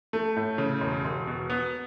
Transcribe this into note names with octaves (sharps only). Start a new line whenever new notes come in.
A3
A2
C#3
E1
E1
B2
B3